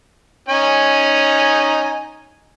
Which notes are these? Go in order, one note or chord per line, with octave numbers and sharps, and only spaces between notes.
C#4 D#4 G#5